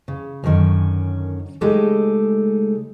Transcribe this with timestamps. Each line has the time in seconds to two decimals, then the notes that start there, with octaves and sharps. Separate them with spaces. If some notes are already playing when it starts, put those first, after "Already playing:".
0.08 C#3
0.44 F#2 D3 D#3 C#4
1.61 C#3 G#3 A3 D#4 G4 A4